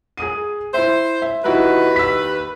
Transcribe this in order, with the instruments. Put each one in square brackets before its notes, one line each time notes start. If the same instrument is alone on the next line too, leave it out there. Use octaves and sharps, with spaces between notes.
[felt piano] G#4 D#6 D#7
[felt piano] E4 E5 [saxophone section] C5
[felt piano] E5
[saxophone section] D#2 B4 [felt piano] D#4 E4 F#4
[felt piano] E6 B6